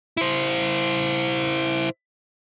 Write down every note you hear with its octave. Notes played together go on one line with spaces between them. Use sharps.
E4 C5